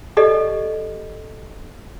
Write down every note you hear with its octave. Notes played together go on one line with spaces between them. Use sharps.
G4 A4 D5 D#5